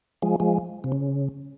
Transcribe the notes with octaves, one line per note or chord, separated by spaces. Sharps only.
F3 G#3
F3 G#3
C3
C#3